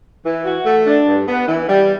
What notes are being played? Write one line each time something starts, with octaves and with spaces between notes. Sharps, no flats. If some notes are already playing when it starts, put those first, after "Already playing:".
E3
F#4
A3
D4
G2
B3
E3
G3